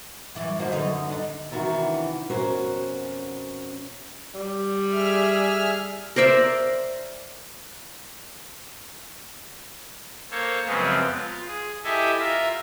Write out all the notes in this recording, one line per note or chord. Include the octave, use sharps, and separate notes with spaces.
F#2 E3 D5
D3 D#3 A#3 D#4 F#4 C5
F#2 D3 B3 D#4
D4 D#4
C3 D#3 E3 D4 E4 F#4
F2 B2 C#4 F#4 A#4 C5
G3
G#4 E5 F6
A#4 C5 D5 E5
A#3 A4 C5 C#5
F#2 C#3 F3 G#3 B3 C4
F4
G#4
E4 G4 A4 D#5 E5 G#5
F4 A#4 E5